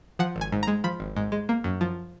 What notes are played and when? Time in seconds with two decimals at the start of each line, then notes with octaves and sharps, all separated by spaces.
0.19 F3 F#5
0.36 G#1
0.41 G#5
0.52 G#2
0.63 G#3 A#5
0.84 F3 B5
1.00 G#1
1.17 G#2
1.32 G#3
1.49 A#3
1.64 F#2
1.81 F3